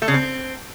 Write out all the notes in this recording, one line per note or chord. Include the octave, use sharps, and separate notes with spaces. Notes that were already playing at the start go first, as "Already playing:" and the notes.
A3
C#3
C4